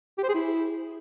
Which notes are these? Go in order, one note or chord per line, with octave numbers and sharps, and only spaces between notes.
G4
C5
G#4
E4